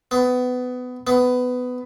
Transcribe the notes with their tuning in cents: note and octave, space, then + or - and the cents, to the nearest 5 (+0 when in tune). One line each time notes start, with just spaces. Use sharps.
B3 +20
B3 +15